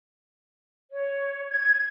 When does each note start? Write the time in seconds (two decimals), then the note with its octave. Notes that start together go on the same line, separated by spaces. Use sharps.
0.91 C#5
1.49 G#6